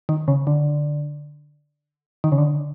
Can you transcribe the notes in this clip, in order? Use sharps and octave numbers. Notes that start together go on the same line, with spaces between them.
D#3
C#3
D3
D#3
C#3
D3